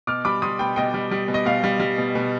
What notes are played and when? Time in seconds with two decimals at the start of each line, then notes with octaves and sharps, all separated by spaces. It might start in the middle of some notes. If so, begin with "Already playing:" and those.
0.07 B2 D6 F6
0.25 G3 B5 D6
0.42 G3 C6 D#6
0.59 B2 G5 B5
0.76 B2 D#5 G5
0.94 G3
1.11 G3
1.28 B2
1.34 D#5
1.45 B2 F5
1.64 G3
1.80 G3
1.98 B2
2.15 B2